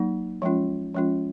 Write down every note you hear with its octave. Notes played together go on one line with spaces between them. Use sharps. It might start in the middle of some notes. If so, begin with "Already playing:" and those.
Already playing: F#3 A#3 D#4
F3 G#3 C#4 F4
F3 G#3 C#4 F4